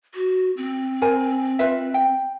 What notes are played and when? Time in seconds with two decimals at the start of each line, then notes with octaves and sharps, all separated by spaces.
0.15 F#4
0.57 C4
1.02 A#4 C5 G#5
1.59 F4 B4 E5
1.94 G5